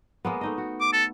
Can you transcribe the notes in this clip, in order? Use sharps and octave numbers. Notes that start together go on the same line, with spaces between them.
G#3 A#3 B3
A3 D#4 D#5
F#4
D6
A4